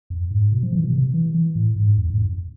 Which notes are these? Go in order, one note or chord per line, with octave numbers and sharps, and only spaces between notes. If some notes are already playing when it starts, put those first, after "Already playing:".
F2
G#2
B2
F3
E3
B2
C3
E3
E3
A2
G#2
E2
G#2
F2